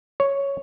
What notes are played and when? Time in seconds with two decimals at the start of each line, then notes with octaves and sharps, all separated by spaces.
0.20 C#5